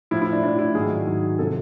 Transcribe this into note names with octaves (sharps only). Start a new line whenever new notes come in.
A2 F3 E4
E4
D4
A2 F3 D4
E4
G#2 D#3 F#3 G#4
G#2 D#3 F#3
C3 F3 A4